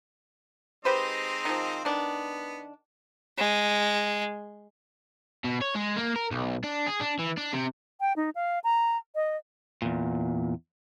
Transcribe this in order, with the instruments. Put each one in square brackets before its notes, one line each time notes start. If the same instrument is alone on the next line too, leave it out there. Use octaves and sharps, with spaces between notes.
[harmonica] G#3 C4 D#4 [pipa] G4 B4 C5
[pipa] D#3 F3
[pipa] D#3 D4 [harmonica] B3
[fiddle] G#3
[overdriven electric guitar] B2
C#5
G#3
A#3
A#4
B1
D4
G#4
D4
E3
D4
C3
[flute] G5
D#4
F5
A#5
D#5
[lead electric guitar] E2 A#2